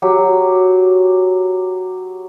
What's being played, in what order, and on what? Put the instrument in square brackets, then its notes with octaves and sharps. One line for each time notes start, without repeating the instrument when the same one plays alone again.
[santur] F#3 G4